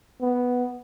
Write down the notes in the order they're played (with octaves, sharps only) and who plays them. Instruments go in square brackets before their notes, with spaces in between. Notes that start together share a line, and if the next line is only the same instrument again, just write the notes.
[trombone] B3